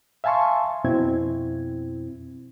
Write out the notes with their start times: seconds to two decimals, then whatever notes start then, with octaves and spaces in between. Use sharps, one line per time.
0.24 E5 F5 G#5 A5 C6 C#6
0.84 F2 B2 C4 E4 G#6